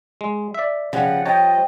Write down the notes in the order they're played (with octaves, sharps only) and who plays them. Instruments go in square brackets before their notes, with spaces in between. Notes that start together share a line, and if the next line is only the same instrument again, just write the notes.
[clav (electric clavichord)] G#3
D5 E5
[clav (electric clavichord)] C#3 [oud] F3 G3 [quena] F#5
[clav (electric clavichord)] C#5 A5 A#5 [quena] D#5 [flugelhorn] G5